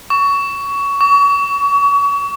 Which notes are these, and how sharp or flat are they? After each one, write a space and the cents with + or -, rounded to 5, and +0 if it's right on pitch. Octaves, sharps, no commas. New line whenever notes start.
C#6 +20
C#6 +35